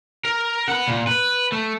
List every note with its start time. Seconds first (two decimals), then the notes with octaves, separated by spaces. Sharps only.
0.25 A#4
0.68 F#5 B5
0.87 A#2
1.07 B4
1.52 A3